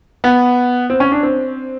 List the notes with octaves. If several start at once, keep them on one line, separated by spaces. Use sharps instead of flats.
B3
C4
C#4
D4
C4